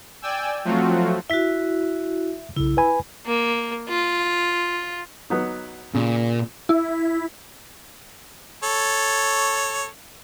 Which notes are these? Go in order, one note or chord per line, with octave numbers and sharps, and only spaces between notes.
D5 G5 G#5 E6
F3 F#3 A3 C4 F4 F#4
E4 F#4 E5 B6
B1 C#3 E4
B4 G#5 B5
A#3
F4
F#3 B3 D#4
A#2 C#3
E4
A4 C#5